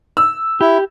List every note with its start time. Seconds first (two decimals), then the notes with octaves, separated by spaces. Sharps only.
0.17 E6
0.61 E4 G4